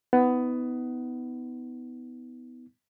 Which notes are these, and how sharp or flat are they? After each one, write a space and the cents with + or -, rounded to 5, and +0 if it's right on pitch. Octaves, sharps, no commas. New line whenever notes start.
B3 +15 D#4 +45